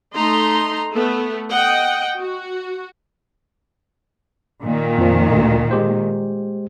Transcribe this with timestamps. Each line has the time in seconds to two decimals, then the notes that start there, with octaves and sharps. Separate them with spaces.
0.15 A3 D#4 A#5 C6
0.93 A3 B3
1.52 D#5 F#5 G5
2.17 F#4
4.64 A#2 D#3
4.98 F2 F3
5.32 D2 D3
5.71 G#3 G4 C5